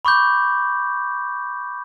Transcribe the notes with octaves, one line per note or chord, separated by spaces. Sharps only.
B5 C#6 D6 G6